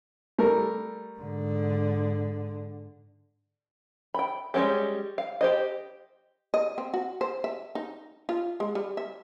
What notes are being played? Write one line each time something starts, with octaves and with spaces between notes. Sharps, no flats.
G3 A3 A#4
G#2 D3
G5 B5
G3 G#3 C4 C#4 G4
F5
G4 C5 D#5
D#5
C4
F#4
C5
E5
D#4
F4
G#3
G3
E5